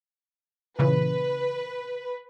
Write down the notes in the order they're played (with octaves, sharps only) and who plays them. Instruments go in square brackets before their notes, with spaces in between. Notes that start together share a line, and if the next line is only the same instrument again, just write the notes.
[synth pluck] A#2 C#3 E3 [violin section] B4